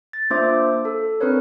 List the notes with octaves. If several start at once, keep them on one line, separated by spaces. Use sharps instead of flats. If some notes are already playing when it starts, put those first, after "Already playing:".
A6
A#3 D4 F4 C5 E5 D6
A4
C4 D4 A#4 B4 C#5